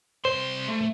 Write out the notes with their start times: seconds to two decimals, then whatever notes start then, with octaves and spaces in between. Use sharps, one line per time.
0.25 C2 C5 C6
0.69 A3